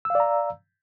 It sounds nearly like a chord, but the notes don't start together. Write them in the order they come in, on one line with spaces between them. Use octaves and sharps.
E6 F5 D5 A#5